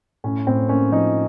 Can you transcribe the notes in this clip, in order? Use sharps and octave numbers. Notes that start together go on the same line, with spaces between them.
A2 C#4
A2 C4
A#3 C#4
F3 D#4